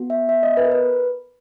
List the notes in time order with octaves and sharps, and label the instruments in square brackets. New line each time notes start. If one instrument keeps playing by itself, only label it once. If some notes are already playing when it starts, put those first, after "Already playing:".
Already playing: [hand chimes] B3 F#4
E5
E5
D#5
B4
A#4
B4